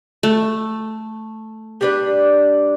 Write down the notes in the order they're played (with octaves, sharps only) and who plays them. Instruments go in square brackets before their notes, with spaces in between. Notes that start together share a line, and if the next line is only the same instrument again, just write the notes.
[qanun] A3
[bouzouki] G3 D4 B4